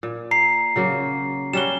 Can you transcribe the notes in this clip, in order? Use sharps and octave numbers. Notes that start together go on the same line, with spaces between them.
A#2
A#5 C7
C#3 F#3 A#3
G3 C#4 F#4 E7 G7